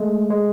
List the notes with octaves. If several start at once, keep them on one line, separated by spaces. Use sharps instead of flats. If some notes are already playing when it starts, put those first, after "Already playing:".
Already playing: G#3 A3
G#3